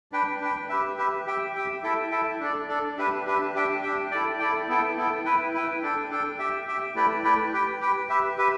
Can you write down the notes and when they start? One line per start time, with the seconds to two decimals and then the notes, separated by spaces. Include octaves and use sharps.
0.12 D4 B4 G5
0.41 D4 B4 G5
0.69 G4 B4 E5
0.98 G4 B4 E5
1.26 G4 E5 G5
1.55 G4 E5 G5
1.83 E4 A4 E5 G5
2.11 E4 A4 E5 G5
2.40 D4 A4 D5
2.69 D4 A4 D5
2.97 D4 G4 B4 E5
3.25 D4 G4 B4 E5
3.54 D4 G4 E5 G5
3.83 D4 G4 E5 G5
4.11 E4 A4 D5 G5
4.39 E4 A4 D5 G5
4.68 B3 E4 A4 G5
4.97 B3 E4 A4 G5
5.25 E4 B4 G5
5.54 E4 B4 G5
5.82 D4 A4 G5
6.10 D4 A4 G5
6.39 G4 E5 G5
6.67 G4 E5 G5
6.95 A3 E4 B4 D5 G5
7.24 A3 E4 B4 D5 G5
7.53 G4 B4 G5
7.80 G4 B4 G5
8.09 G4 B4 E5
8.38 G4 B4 E5